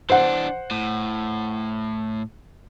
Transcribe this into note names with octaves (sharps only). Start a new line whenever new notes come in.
E3 D4 C5 F#5
A2